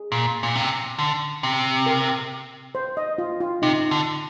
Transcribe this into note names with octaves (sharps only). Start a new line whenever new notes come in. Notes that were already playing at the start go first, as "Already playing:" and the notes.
Already playing: G#4
A#2
A#2
C3
D3
C3
A#4
C5
D#5
F4
F4
C3 D#4
D3